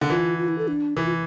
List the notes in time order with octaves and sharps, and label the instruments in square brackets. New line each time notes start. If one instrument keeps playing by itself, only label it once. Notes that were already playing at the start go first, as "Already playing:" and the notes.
[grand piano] D3
[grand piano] E3 [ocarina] F4
[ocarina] F4
E4
A4
D4
[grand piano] E3 [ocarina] E4
[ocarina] F4